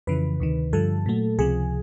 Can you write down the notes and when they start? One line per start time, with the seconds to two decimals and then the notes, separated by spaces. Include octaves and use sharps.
0.07 F2 C#3 E3 B4
0.40 D2 C3 D#3
0.73 G2 D3 F3 A4
1.06 A#2 F#3 A3
1.39 C#2 C3 F3 G#4